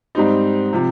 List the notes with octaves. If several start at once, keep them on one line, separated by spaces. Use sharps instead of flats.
G#2 G3 C4 D#4
C3 F3